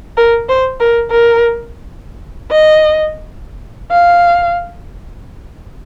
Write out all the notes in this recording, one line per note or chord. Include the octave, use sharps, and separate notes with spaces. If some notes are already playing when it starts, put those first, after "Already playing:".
A#4
C5
A#4
A#4
D#5
F5